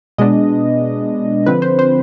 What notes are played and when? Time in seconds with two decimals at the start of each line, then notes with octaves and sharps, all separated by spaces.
0.18 B2 G#3 B3 D4 D#5
1.46 D3 F3 C4 B4
1.62 C5
1.79 C5